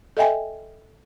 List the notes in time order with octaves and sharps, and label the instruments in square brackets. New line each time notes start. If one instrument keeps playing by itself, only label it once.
[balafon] A4 D#5 E5 G5 G#5